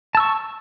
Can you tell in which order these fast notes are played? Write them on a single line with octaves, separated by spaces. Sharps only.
A5 E6 C#6